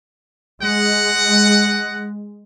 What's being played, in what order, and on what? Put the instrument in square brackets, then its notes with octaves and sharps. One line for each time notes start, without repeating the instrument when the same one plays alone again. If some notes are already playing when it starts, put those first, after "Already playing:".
[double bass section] G#3 [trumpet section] D#5 F#5